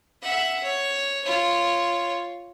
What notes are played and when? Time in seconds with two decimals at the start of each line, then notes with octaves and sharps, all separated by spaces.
0.22 E5 F#5
0.63 C#5
1.25 F4 C#5